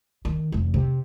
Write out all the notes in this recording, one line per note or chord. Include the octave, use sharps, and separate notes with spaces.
D#3
F1 E2
C3